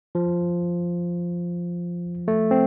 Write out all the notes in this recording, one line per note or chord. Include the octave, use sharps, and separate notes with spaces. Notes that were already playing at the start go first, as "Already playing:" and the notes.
F3
A3
C4